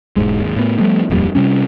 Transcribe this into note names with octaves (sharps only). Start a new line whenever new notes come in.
E1 G#2 G#3
D#2 G#2
A2 B3
F3 G3 A3 B3
D#1 F2 A#2 G3
C3 G3 C#4